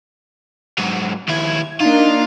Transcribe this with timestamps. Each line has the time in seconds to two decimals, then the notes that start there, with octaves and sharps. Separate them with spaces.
0.79 G#2 F#3
1.28 D#2 E4 G#6
1.80 A#3 D4 D#4 F4